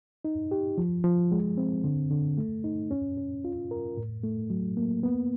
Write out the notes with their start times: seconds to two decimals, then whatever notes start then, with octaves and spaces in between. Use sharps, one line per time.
0.25 D#4
0.51 G4
0.78 F3
1.04 F3
1.32 G#3
1.58 C4
1.84 D3
2.11 D3
2.38 A3
2.64 D#4
2.91 C#4
3.17 C#4
3.44 F4
3.71 A#4
3.97 A2
4.24 A3
4.50 F#3
4.77 A#3
5.03 B3